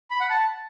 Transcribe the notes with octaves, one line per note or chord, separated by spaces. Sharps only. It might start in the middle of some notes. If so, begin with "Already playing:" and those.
B5
F#5
A5